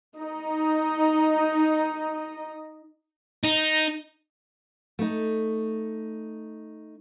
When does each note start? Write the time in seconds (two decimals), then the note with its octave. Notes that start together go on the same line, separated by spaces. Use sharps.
0.17 D#4 D#5
3.45 D#4
4.99 A3 D#4